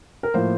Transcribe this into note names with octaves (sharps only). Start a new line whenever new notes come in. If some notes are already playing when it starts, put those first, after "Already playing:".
A#4
A2 F3 A#3 C5